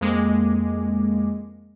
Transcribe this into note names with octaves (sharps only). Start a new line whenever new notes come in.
F2 G#3 A#3 D6